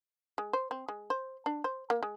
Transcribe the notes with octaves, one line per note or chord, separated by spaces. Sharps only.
G#3
C5
C4
G#3
C5
D4
C5
A#3
G#3